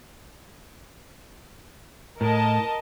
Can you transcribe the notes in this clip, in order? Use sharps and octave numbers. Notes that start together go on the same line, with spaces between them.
A2 A#4 D#5 A5